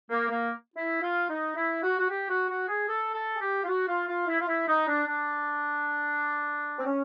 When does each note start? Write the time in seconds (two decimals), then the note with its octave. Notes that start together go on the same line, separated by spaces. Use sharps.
0.10 A#3
0.30 A#3
0.76 E4
1.02 F4
1.29 D#4
1.56 E4
1.83 F#4
1.99 F#4
2.09 G4
2.29 F#4
2.49 F#4
2.68 G#4
2.88 A4
3.14 A4
3.35 G#4
3.41 G4
3.64 F4
3.68 F#4
3.88 F4
4.08 F4
4.28 E4
4.41 F4
4.48 E4
4.68 D#4
4.88 D4
5.07 D4
6.78 C4
6.86 C#4